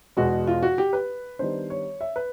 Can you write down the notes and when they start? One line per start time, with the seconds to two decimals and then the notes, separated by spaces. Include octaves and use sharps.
0.17 E2 B2 G#3 F#4
0.47 F4
0.63 F#4
0.78 G4
0.93 B4
1.39 D#3 G3 B3 D4 C5
1.70 C#5
2.01 E5
2.16 B4